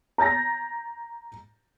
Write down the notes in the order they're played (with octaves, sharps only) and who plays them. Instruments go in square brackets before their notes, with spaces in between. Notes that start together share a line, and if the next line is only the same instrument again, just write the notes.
[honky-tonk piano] A#5 G6 A6 A#6